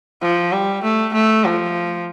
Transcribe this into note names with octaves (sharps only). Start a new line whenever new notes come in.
F3
G3
A3
A3
F3